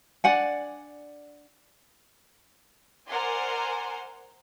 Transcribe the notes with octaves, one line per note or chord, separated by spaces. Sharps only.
D4 D5 F#5 G#5
A#4 C5 D5 F#5 G#5 C6